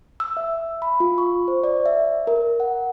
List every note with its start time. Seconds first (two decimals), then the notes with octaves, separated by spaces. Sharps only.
0.20 E6
0.37 E5
0.82 B5
1.00 F4
1.18 C#6
1.48 C5
1.64 D5
1.86 E5
2.27 A#4
2.60 F#5